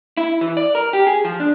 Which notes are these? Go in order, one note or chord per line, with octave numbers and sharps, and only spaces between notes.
E4
E3
D5
A#4
G4
G#4
F3
D4